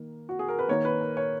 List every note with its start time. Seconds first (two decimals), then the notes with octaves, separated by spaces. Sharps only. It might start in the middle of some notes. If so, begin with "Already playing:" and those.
Already playing: D#3 A#3
0.29 F#4
0.39 G#4
0.48 A#4
0.59 B4
0.68 D#3 A#3 C#5
0.85 B4
1.01 A#4
1.17 C#5